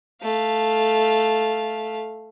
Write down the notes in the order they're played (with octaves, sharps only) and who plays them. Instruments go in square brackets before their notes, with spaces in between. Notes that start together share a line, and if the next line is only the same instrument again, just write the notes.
[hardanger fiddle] A3 F5